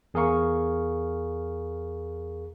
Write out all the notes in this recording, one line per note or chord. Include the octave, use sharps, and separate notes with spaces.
E2 G#4 A#4 F5 C#6